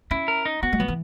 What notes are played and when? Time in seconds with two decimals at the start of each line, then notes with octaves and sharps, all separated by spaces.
0.11 C#4 E4
0.28 A#4
0.45 D#4
0.63 B3 F#4
0.73 G#3
0.80 F#3 B3
0.88 E3